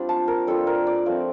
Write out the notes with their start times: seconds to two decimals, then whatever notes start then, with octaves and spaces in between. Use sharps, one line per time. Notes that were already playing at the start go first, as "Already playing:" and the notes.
Already playing: G3 C4 D4 F4
0.09 A5
0.28 A#4
0.47 G3 D4 F4 A4
0.67 A#4
0.87 D5
1.06 F3 A3 C4